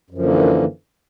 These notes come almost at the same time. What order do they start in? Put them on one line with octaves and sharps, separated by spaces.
F#2 F3 D3 A#3 E3